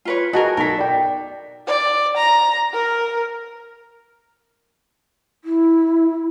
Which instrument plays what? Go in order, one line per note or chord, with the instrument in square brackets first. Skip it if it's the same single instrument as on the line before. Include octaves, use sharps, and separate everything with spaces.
[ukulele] F4 B4 C#5
[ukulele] F#4 G#4 A#4 [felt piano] D#5 A5
[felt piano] B1 B6 [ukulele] A4 A#4
[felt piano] D5 G5
[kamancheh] D5
A#5
A#4
[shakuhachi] E4